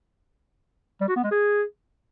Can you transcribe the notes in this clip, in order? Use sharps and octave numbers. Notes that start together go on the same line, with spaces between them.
G3
F#4
B3
G#3
G#4